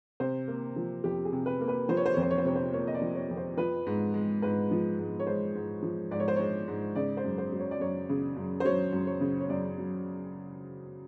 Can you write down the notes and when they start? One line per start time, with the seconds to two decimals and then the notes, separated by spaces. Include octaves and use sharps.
0.20 C3 C5
0.48 A#3
0.76 F3
1.04 F2 G4
1.25 G#4
1.33 C3
1.46 B4
1.61 A#3
1.68 B4
1.89 F3 C5
1.97 C#5
2.06 C5
2.14 F2 C#5
2.22 C5
2.31 C#5
2.38 C5
2.45 C3 C#5
2.56 C5
2.73 A#3 C#5
2.87 D#5
2.94 D5
3.02 F3
3.15 C#5
3.29 F2
3.37 C5
3.57 F3 B4
3.87 G#2
4.14 G#3
4.42 G#2 B4
4.71 F3
4.98 G#2
5.20 C#5
5.27 G#3 C5
5.55 G#2
5.83 F3
6.11 G#2 D5
6.20 C#5
6.28 C5
6.36 G#3 C#5
6.68 G#2
6.96 C#3 D5
7.17 C5
7.24 F#2
7.38 C5
7.52 F#3
7.60 C#5
7.71 D5
7.80 F#2 C#5
8.09 C#3
8.37 F#2
8.60 C5
8.65 F#3 C#5
8.93 F#2
9.07 C#5
9.21 C#3
9.40 C#5
9.49 F#2 D5
9.78 F#3